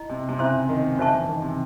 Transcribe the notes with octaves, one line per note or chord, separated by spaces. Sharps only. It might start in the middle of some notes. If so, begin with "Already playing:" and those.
Already playing: E4 D#5
C3
C3
C#3 E4 C5 E5 C6
D#3
C#3
D#3 F#4 C5 E5 A5 C#6
E3
D#3
C3